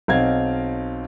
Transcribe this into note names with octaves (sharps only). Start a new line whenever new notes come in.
B1 C4 D#5 F5 G#6